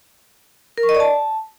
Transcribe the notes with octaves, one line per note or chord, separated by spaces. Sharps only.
A#4
C#6
D#5
D5
A5